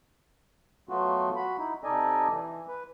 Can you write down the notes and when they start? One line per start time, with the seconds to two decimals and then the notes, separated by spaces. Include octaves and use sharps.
0.89 F#3 A3 B3 F4 F#4
1.36 F#4 B5
1.58 D#4 E4
1.84 C3 D#4 A4 D5 D#5 G#5
2.29 E3
2.68 B4